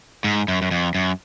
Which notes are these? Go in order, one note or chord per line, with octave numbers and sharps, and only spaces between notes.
G#2
F#2
F#2
F2
F#2